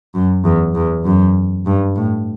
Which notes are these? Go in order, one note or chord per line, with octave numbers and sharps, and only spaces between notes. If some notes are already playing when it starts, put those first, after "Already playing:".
F#2
E2
E2
F#2
G2
A2